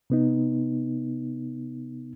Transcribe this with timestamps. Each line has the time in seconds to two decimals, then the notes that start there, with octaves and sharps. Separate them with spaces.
0.10 C3 B3 D#4